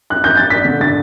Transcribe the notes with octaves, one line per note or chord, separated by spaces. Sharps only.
F#6
G6
A6
D4 B6
D3
D3 A6